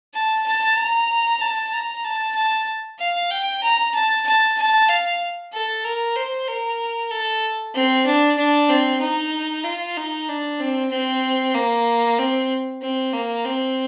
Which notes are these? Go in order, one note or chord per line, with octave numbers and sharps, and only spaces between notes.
A5
A5
A#5
A5
A#5
A5
A5
F5
G5
A#5
A5
A5
A5
F5
A4
A#4
C5
A#4
A4
C4
D4
D4
C4
D#4
F4
D#4
D4
C4
C4
A#3
C4
C4
A#3
C4